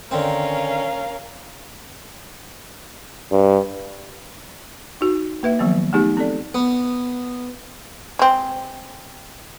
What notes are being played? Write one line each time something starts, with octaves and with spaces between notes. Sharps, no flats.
D3 D#3 C4 C#4 A#4 F5
G2
D#4 F#4
A#3 B4 E5
D#3 F3 F#3 A#3 B3
A3 B3 D#4 G4 G#4
C4 A4 D5
B3
G#3 C4